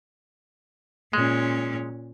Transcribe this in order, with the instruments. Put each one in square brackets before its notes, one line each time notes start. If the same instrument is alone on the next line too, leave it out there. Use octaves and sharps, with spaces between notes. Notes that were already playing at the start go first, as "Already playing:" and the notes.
[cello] A#2 C#4 [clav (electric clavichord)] G#3